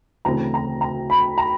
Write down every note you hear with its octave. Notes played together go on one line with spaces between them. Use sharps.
D2 C#3 E3 A3 C4 A#5
A#5
A#5
B5
A#5